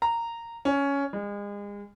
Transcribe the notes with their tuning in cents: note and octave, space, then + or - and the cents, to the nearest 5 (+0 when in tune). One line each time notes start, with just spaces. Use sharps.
A#5 -10
C#4 +10
G#3 -35